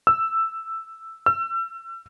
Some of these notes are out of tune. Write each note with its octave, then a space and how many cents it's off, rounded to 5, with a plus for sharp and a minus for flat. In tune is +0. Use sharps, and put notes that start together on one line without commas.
E6 +5
E6 +35